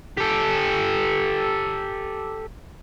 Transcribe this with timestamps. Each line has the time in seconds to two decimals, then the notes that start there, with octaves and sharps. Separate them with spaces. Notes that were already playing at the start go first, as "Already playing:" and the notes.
0.17 G4 A4